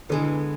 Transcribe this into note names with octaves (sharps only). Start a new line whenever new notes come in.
D3 E3 G#3 B3